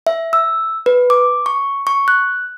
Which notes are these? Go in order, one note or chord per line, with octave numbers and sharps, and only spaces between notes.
E5
E6
B4
D6
C#6
C#6
F#6